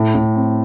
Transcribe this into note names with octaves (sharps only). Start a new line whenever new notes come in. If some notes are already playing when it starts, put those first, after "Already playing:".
Already playing: A2
A2
C4